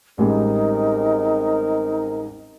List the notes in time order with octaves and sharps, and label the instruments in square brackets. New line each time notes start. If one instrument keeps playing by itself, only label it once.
[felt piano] A1 G3 G#3 [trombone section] C4 A#4 [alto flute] D#4